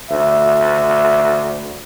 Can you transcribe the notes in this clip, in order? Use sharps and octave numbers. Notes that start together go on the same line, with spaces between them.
D2 E5